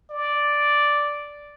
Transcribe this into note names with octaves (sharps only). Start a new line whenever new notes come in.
D5